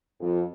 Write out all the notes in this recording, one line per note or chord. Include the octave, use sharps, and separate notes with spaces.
F2